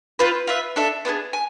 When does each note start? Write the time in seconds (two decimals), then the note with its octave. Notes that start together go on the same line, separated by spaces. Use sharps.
0.19 C4 F4 B4
0.47 F4 B4 E5
0.76 D4 A4 E5
1.05 B3 D4 F4 G#4
1.33 G#5